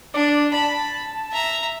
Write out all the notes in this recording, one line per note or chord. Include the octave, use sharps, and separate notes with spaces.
D4 D5
A5 B5
E5 A#5